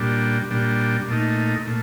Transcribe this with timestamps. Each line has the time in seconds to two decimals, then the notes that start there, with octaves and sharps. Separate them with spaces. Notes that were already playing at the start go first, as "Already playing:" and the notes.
Already playing: A#2 G3 D4
0.51 A#2 G3 D4
1.08 A#2 A3 D#4
1.67 A#2 A3